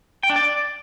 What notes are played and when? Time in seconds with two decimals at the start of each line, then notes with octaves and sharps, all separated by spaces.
0.23 G5
0.30 D4
0.36 D5